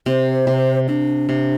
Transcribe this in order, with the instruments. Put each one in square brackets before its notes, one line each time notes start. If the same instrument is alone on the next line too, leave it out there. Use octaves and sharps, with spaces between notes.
[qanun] C3 [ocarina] C5
[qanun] C3
[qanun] C3 [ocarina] D4
[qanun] C3